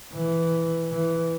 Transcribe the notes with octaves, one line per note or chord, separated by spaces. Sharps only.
E3
E3